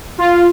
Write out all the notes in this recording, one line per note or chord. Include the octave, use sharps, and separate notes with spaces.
F4